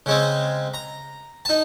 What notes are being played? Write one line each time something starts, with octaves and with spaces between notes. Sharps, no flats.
C#3 G#3 C4
A#5
D#4 A5